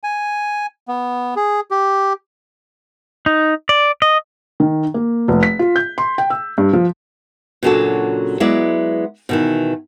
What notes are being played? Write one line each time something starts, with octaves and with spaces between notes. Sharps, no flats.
G#5
B3
G#4
G4
D#4
D5
D#5
D#3
A#3
F1
B6
F4
G6
C6
G5
E6
G2
F3
A#2 C#3 F#3 D4 F#4 A4
F#3 G#3 B3 E4 B4 D5
B2 D#3 E3